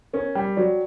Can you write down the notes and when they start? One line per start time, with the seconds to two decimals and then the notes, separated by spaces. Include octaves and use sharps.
0.13 C#4 A#4
0.35 G3 G5
0.57 F#3 D5